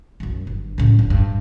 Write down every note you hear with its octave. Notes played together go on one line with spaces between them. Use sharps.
B1 F#2
G1
A2 C#3
D4
G2